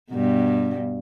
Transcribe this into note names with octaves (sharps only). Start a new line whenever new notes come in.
G2 B2